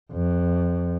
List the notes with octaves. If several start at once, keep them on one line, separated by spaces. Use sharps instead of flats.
F2